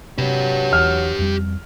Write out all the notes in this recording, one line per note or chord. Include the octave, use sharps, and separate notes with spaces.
C3 F#3 G4 B4
E2 F6
F2 G3